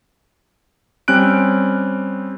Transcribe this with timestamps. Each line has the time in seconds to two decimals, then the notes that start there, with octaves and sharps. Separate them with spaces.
1.08 G3 C4 C#4 F#6 D7